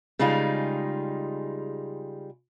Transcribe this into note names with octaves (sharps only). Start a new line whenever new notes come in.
C#3 G3 G#3 D#4 F4 G#4